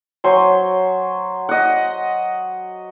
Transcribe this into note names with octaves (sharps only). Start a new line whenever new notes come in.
F#3 C5 G#5 C6
D#5 F#5